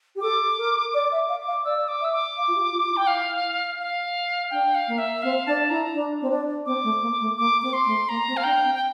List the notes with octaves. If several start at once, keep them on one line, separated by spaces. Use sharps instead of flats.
G4
A4 D6
A#4
D5 D6
E5
D6
F5
D6
F5
D5 E6
D6
E5 E6
D6
F5
F4
G4
F4
E4
G5
F5
F5
D4 G5
F5
A#3
E5
C4 F5
D4 A5
E4 A#5
D4
C4
D4
C4 D6
A3
A#3
A3
A#3 D6
C4 D6
C6
A3
A#3 A#5
C4
F5
D4 G5
C4
G5